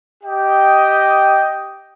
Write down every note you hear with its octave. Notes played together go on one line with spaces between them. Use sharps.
G4 D#5 G5